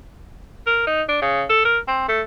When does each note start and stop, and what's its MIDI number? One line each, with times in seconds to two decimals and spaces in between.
0.67 0.85 70
0.87 1.02 63
1.08 1.21 62
1.22 1.44 49
1.50 1.63 69
1.65 1.79 70
1.87 2.08 60
2.08 2.22 57